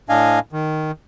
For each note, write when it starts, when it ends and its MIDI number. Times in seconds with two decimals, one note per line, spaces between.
0.09 0.39 45
0.09 0.39 62
0.09 0.39 75
0.09 0.39 77
0.09 0.39 80
0.53 0.91 51